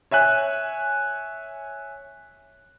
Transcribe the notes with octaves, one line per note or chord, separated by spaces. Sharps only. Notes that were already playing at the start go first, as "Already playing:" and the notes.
C#5 E5 G#5 F#6